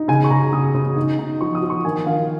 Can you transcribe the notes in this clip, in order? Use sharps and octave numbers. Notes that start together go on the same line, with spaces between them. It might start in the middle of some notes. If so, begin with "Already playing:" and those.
Already playing: D#4
C#3 G#5
C#6
C#3 A#5
C#3 D#6
C#3
D#4
D#4
F3 C#6
D#6
F3
C#6
D#3 G#5
D#3 F5